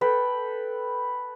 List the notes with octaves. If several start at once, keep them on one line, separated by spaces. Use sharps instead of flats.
A4 B4 G5